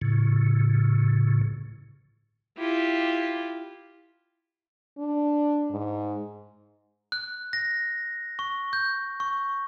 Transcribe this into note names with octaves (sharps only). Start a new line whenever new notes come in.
A2 C#3
E4 F4 G4
D4
G#2
F#6
A#6
C#6
G6
C#6